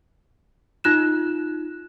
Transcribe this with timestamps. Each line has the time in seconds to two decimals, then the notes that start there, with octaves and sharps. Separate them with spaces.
0.84 D#4 F4 F#6 E7